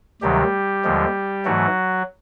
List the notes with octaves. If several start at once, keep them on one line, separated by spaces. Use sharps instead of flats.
D2 C3 D#3 F#3 G3 G4
D#2 D3 F3 G#3
G#2 E3 F#3 A3 F#4